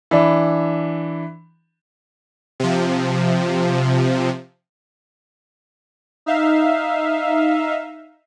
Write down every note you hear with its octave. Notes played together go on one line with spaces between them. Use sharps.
E3 D4
C3 F3
D#4 E5 F5